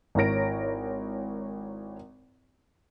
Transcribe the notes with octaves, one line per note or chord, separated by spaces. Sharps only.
G#1 E4 A#4 C#5 A#6 D7